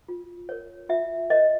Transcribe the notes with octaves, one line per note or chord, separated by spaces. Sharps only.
F4
A#4 C#5
F4 E5
A#4 C#5 D#5